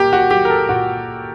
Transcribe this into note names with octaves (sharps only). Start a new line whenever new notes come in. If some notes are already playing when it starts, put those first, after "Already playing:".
Already playing: A#2 A#3 G4
F#4
F#3 G4
A#4
A4
A#2 F#4